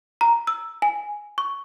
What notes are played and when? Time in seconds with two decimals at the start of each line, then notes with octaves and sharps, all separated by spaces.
0.21 A#5
0.47 E6
0.82 G#5
1.38 C#6